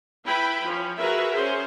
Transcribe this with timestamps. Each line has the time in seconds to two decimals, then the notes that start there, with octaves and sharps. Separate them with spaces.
0.24 E4 B4 G5 B5
0.66 F3 C#4
0.99 F#4 G#4 A#4 B4 E5
1.34 C#4 G#4 C5